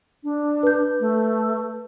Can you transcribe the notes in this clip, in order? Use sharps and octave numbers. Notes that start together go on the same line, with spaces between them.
D4
B4 G6
A3